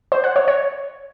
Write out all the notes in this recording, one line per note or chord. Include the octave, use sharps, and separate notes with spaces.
C5
F#5
C#5
C#5